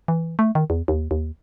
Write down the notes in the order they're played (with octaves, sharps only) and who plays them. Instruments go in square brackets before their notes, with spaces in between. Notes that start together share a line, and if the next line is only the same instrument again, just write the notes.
[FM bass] E3
A3
D#3
E2
D#2
D#2